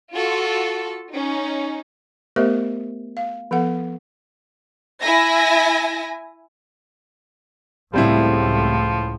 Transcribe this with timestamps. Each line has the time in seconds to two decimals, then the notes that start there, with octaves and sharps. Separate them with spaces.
0.12 F4 F#4 A4
1.13 C#4 D#4
2.36 A3 B3 G4 A#4 C5 E5
3.17 F5
3.51 F3 B3 A4 F#5
5.02 E4 E5 G#5 A#6
7.94 C#2 A2 F3 G3 C4 E4